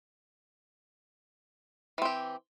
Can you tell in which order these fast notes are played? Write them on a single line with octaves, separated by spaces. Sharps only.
E3 C4 G4